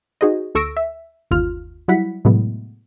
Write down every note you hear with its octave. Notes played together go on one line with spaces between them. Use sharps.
D#4 F#4 G#4 C5 D#5
D2 A4 C#6 E6 A#6 D7
E5
G1 D#2 F4 F6
F#3 G3 E4 F#5 B6
A2 C3 F#3 G#3 A3 B3